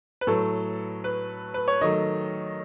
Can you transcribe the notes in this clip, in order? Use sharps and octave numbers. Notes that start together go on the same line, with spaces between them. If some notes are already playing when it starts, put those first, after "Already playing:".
B4
A2 F#3 A3 A4
B4
B4
C#5
D#3 F#3 A3 D#5